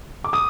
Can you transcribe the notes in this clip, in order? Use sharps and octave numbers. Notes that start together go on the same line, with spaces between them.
D6
D#6